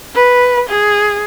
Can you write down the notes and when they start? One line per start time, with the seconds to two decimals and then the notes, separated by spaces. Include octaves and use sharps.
0.15 B4
0.69 G#4